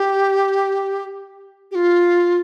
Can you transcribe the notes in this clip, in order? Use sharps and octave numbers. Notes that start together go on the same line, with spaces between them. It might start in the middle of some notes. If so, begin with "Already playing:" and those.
Already playing: G4
G4
F4